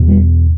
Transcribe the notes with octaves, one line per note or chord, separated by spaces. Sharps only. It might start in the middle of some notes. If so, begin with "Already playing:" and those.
Already playing: E2 B2
G3